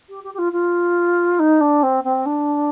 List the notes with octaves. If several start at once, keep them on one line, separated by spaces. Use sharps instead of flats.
G4
G4
G4
F4
F4
D#4
D4
C4
C4
D4